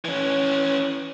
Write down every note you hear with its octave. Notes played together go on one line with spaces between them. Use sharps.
E3 C#4